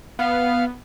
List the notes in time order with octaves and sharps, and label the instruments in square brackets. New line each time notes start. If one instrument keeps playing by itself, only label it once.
[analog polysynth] B3 [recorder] F5